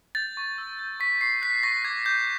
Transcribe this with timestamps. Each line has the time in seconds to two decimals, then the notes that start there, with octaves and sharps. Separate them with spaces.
0.15 G6 A6
0.37 C#6
0.58 E6
0.79 G6
1.00 C#6 B6
1.21 C#6 C7
1.42 F#6 B6
1.63 C#6 A#6
1.84 D6 G#6
2.06 D6 G6